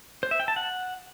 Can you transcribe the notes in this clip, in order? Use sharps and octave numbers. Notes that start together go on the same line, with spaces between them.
C5
E5
G5
A5
F#5